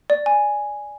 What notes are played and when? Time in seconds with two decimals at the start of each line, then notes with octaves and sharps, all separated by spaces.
0.10 D5
0.26 G#5